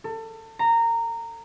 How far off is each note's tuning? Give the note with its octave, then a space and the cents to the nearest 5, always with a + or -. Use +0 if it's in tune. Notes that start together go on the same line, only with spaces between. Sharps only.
A4 +30
A#5 -15